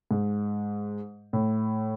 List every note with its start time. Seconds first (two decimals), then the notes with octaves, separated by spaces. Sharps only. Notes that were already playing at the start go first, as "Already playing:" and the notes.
0.11 G#2
1.33 A2